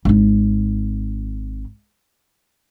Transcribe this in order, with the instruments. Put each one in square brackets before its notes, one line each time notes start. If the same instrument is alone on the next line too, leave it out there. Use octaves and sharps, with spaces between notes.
[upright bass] G#1 D#4